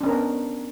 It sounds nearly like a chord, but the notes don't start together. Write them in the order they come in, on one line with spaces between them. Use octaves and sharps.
D4 C#4 A#4 B3